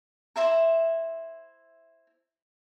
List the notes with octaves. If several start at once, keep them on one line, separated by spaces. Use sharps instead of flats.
E4 C5 E5 A#5